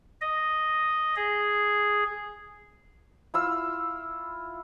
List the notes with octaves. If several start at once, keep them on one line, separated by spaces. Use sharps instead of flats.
D#5
G#4
E4 F4 E6